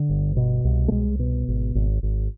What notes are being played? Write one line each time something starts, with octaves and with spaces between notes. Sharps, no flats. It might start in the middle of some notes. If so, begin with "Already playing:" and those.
Already playing: D3
G1
B2
C2
A3
C2 G#3
B2
G#1
G#1
G#1